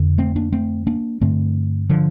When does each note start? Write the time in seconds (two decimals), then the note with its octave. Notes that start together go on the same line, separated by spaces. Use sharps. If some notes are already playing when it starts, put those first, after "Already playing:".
Already playing: F2 D3
0.18 A3 C4
0.36 A#3 D4
0.52 A3 C4
0.87 A#3 D4
1.21 G2 D3 A3 C4
1.89 D3 F3